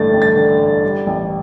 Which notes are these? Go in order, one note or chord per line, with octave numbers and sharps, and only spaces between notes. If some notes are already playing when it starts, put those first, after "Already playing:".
Already playing: A1 G2 D3 A3 A6
A1
A6
D3
G2
G3
A1